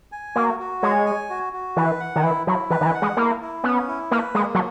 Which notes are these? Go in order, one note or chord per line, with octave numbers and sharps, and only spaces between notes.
G#5
A#3 F#4
F#4
G#3 C#5
G#5
F#4
F#4
E3 B4
F#5
D#3
E3 E4
F#3 E4
E3 B4
D#3
E3
F#5
G#3
A#3 E4
E4
B3 C#4
E4
A#3 B4
G#3 A#3
F#3